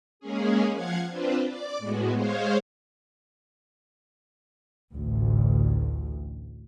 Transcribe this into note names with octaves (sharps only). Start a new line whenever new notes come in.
G#3 A#3 C#4 G#4
F3 F5 F#5 G#6
C4 D4 F4 B4 C5
D5 D6
A2 G#3 B3 F#4
G#3 G#4 C5 C#5 F5
A1 D2